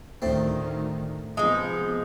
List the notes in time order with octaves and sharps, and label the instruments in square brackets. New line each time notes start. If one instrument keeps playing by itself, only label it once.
[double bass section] D2 D#3 [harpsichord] A2 C4
[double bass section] C3 F3 B3 [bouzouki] G#3 D#4